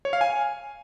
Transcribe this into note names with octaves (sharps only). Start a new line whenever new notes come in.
C#5
F5
G#5